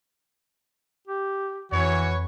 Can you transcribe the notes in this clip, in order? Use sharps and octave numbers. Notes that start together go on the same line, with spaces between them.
G4
F2 E3 F#4 B4 C#5